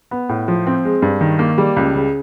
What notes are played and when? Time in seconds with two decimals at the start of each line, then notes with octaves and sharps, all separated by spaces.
0.11 B3
0.29 A2
0.48 F3
0.67 C4
0.85 G#3
1.02 G2
1.21 D#3
1.39 A#3
1.58 G3
1.77 C#2
1.95 C#3